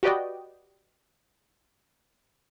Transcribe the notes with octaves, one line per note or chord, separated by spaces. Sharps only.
F#4 G4 B4 D5 D#5 G5